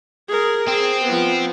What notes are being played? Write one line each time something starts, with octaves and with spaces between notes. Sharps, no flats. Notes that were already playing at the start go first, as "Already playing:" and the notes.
G#4 A#4
C4 G#4
F3 B3